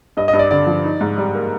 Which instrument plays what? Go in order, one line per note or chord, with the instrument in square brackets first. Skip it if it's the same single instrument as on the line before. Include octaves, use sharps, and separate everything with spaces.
[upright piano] G2 [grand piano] D#5
[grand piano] D#5
[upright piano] G2
[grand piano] D5
[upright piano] D3 [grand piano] D5
[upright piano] F3
D#4
G#2
G3
A#3